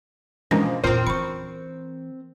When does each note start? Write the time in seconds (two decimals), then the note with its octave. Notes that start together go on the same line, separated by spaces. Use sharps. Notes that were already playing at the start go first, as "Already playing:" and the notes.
0.51 G#2 B2 E3 F3 G#3 C#4 D4 A#4
0.84 E2 A#2 C4 F4 A#4 C5 C6
1.07 E3 B5 C#6 C#7